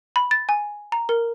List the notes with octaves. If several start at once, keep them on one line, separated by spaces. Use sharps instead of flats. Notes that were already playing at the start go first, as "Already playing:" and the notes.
B5
A6
G#5
A#5
A#4